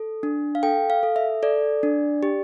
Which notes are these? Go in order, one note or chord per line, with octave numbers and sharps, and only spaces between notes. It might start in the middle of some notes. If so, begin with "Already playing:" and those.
Already playing: A4
D4
F5
A4 G5
F5
A4
E5
A4 D5
D4
G4